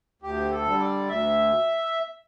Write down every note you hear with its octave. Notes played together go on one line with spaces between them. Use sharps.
D2 G4
A4
D3 G3
D5
D2 E5